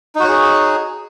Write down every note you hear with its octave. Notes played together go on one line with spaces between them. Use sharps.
D#4 F#4 G#4 C#5